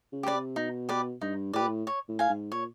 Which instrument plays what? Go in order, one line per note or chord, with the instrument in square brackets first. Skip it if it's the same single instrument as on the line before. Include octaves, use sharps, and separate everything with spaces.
[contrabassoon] C#3
[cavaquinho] G4 B4 D5
[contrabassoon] C3
[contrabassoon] B2 [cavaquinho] D#4
[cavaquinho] G4 B4 D5
[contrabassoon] G2 [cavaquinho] D#4
[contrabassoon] A2 [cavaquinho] G4 B4 D5
[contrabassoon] A#2
A2
[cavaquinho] C#5
[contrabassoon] A2
[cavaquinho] F5 G#5
[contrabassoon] G#2
[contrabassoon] A#2 [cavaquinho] C#5